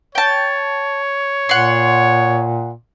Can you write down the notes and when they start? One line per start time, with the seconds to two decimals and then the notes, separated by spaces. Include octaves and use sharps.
0.15 C#5 G5 A5
1.49 A#2 F#5 C6